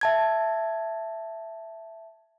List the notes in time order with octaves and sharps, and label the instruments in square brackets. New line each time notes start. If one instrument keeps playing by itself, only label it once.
[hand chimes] E5 A5 G#6